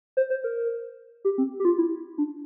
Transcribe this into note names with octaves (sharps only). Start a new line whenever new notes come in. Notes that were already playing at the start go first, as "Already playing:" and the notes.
C5
C5
A#4
G4
C4
G4
F4
E4
D4